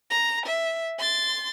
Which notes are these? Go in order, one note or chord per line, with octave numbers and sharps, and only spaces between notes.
A#5
E5
C6 A6